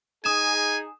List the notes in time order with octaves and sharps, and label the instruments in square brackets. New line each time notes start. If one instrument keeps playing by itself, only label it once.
[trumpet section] D#4 G#4 [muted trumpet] G#5 [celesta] D#6 E7